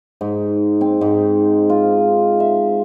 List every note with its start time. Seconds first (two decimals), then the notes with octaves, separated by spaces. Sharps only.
0.21 G#2
0.81 C4
1.01 G#2
1.70 F4
2.40 E5